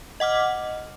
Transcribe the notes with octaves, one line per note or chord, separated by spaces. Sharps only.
D#5 F#5 D6 F6